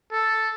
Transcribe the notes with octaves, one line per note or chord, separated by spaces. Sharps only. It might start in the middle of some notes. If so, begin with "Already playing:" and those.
A4